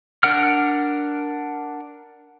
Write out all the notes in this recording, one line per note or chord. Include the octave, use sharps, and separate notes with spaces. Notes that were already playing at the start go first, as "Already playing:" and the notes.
D4 A#4 F#5 F6